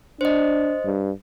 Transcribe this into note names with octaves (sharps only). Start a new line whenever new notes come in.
D4 C5 D#5
G2